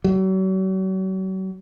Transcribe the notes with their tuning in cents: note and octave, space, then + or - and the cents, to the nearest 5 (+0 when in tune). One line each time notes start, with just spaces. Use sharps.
F#3 +40